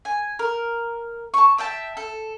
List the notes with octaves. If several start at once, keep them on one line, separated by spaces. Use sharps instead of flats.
G#5
A#4
A5 C#6
E5 G5 A5
A4